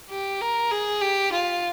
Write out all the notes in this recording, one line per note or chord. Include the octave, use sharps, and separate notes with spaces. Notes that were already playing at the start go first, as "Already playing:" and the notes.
G4
A#4
G#4
G4
F4